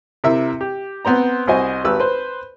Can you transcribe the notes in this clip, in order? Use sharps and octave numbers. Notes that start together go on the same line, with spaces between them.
C3 E4 A#4 E5 E6
G4
B3 C4 C5 A#5
C2 F#4 C5 D#5 G#5
G#1 G4 B4 E6
B4 C5